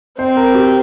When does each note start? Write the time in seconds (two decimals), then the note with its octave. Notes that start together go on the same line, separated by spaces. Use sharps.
0.19 C4 C5
0.37 A#4
0.55 G4